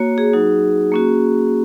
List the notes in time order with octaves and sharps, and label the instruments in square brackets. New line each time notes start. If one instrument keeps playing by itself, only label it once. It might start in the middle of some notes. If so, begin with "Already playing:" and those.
Already playing: [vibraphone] A#3 F#4 C#5
G#4
F#3 D#4 F#4
A#3 C#4 F#4